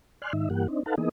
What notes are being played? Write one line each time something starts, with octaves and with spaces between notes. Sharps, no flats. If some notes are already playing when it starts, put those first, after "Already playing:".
D5 G#5 C6 F6 F#6
G#2 D#3 D#4 E5
G2 E3 A#3 G4 F#5
C4 D4 D#4
D#4 A4 B4 F5 F#5 A5
E3 A#3 B3 D#4 G#4 D#5